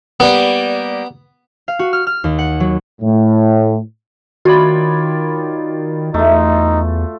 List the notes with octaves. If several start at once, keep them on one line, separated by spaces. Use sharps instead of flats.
G3 A#3 B3
F5
F#4
F6
F6
D#2
F#5
F#3
A2
D#3 F4 F#4 C#5 D5 B5
E2 A3 D#4 F4